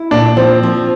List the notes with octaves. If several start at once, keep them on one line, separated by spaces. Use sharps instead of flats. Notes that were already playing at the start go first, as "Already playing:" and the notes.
Already playing: E4
A#2 D4
F3 C4
F3